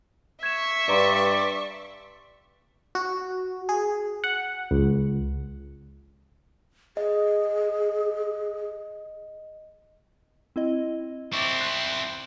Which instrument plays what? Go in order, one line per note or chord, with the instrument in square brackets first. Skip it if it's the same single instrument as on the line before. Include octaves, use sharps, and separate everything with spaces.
[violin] E5 C#6 [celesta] G#6 E7
[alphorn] G2 [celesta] B4 A#5 C6 [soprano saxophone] D5
[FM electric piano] F#4
G#4
F#5
C#2
[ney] G#4 [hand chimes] D#5
[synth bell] C4 E4 D#5
[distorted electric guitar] C4 E4 [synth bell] C#6 D6 A6
[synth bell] C6 F#6